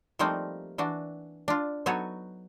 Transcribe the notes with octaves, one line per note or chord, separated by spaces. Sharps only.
F3 G3 A3 A#3 C4 D#4
E3 D4 F#4
D4 F4
F#3 B3 D#4 F#4 A4 C#5